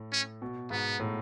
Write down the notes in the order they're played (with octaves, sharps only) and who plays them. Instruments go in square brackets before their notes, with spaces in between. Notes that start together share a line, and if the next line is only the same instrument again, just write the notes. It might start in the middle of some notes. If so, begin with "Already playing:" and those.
Already playing: [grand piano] A2
[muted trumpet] C#4
[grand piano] B2
[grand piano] G#2 [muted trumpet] B3
[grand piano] A2